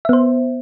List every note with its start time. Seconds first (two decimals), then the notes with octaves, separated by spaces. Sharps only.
0.05 E5
0.09 B3
0.13 C5